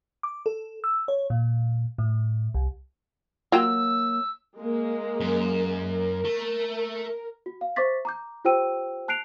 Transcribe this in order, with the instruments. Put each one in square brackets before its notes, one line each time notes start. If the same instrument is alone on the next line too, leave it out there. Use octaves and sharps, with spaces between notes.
[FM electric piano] D6
A4
E6
C#5
A#2
A2
C2
[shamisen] F#3 [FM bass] A#3 [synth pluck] F4 G5 E7 [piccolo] E6
[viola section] G#3 A#3 A#4
[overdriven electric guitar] F#2
[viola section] A#4
[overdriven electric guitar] A3
[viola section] A#4
[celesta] F#4
F5
C5 E5 C#6 D6 A6 B6
A#5 D6 G6
F4 G4 C5 G5 E6 D#7
A5 F#6 C7 D7 F7